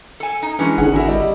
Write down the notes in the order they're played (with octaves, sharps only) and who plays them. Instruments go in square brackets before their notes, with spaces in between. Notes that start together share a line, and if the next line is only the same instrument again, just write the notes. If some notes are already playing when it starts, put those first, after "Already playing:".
[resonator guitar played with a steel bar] A4 G#5
D#4
[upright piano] E3 G#3 B4 [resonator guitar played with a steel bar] C#4 [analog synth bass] D4
[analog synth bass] G#1 [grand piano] D3 G#4 [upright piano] F#5 G#5
[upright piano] E4 F#4 A#4
[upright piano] G3 [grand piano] D#5